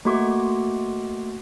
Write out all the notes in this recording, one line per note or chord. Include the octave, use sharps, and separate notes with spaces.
A3 A#3 F#4 C#6 D6